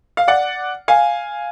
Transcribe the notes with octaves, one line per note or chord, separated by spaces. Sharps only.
F5
D5 F#5
F5 G#5